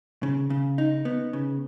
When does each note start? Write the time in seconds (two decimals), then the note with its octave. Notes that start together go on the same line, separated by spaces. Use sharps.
0.23 C#3
0.50 C#3
0.78 D#4
1.05 B3
1.33 C#3